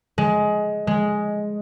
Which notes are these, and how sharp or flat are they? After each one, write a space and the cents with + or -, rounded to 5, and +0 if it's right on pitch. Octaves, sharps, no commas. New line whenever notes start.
G#3 +15
G#3 +5